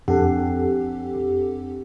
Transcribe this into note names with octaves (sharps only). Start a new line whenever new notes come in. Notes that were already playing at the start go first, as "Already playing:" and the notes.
F2 C4 D4 G4 A4 F#5